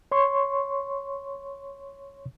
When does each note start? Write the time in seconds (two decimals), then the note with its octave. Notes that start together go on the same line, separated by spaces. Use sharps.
0.12 C#5 C6 C#6